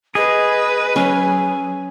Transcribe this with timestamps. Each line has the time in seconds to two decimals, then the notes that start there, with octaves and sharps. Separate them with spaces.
0.15 G#4 B4 D#5
0.96 F#3 C#4